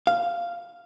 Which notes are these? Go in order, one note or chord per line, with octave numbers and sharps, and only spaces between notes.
F5